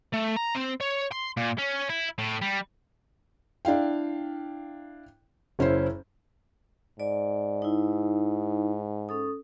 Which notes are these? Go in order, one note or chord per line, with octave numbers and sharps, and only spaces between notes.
A3
A#5
C4
C#5
C6
A#2
C#4
E4
A2
G3
D4 E4 F5 G5
F#1 C#4 E4 C5
G#2 D5
D#4 E4
C#4 A4 D#6